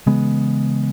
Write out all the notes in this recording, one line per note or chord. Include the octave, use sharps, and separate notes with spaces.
C#3 E3 G#3 B3